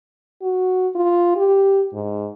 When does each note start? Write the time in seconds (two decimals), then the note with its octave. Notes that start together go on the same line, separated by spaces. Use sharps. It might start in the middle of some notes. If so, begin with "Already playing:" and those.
0.42 F#4
0.95 F4
1.36 G4
1.93 G#2